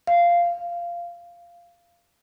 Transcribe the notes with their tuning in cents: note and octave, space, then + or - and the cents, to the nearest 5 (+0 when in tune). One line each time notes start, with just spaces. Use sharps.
F5 -10